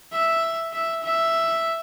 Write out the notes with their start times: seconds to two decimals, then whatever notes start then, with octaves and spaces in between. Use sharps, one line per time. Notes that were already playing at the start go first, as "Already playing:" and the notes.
0.12 E5
0.73 E5
1.03 E5